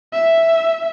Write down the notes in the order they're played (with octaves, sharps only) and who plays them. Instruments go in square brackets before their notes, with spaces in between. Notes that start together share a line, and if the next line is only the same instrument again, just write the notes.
[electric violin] E5